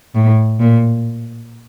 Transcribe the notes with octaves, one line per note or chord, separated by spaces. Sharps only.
A2
A#2